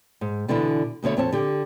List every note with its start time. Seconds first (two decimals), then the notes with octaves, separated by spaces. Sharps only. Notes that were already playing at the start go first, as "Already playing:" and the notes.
0.21 G#2
0.48 B2 D3 E3 B3 D4 E4
1.02 D2 B2 D3 C#5 E5
1.17 F2 C4 C#5 A5
1.32 D3 G4